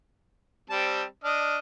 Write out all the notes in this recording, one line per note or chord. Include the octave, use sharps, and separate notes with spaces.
G3 C4 A5
D4 D#5 F6